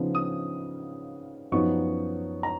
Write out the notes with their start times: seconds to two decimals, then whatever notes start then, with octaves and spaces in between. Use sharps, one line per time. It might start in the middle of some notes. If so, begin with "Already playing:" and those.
Already playing: C#3 F3 B3 D#4
0.15 D#6
1.52 F#2 F3 B3 D#4 C#6
2.43 A#5